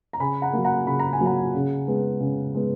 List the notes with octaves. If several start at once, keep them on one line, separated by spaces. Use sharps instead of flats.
A#5
C#3 G#5 B5
F#5 A#5
F#3 A#3
F#5 A#5
C#3 B5
A#5
G#5
F#3 A#3
F#5 A#5
C#3
G#3 B3
C#3
G#3 B3